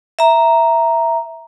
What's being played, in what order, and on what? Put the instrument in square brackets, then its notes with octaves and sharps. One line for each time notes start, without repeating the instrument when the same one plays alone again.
[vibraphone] E5 A#5